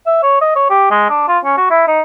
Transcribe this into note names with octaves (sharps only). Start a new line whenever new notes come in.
E5
C#5
D#5
C#5
G4
G#3
D4
F4
C#4
F#4
E4
D#4